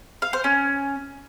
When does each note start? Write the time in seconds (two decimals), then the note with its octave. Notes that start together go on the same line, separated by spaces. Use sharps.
0.22 F5
0.33 C5
0.44 C#4